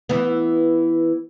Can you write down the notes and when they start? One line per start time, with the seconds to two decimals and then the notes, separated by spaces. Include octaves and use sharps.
0.09 E3 B3